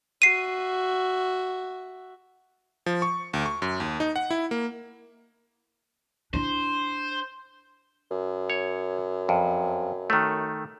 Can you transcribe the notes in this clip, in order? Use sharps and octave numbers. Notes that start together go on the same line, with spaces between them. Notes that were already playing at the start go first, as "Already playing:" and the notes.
F#4 E5 C7 D#7
F3
C#6
D2
C#6
F#2
D#2
D#4
F#5
E4
A#3
D4 E4 C5
F#2
C#5
F2
D#3 A3